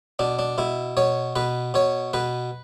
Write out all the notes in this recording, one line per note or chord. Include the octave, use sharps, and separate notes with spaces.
B2 D4
D4
B2 E4
B2 C#5
B2 B4
B2 C#5
B2 B4